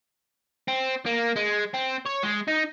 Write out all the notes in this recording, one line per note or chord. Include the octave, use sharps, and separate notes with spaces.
C4
A#3
G#3
C4
C#5
G#3
D#4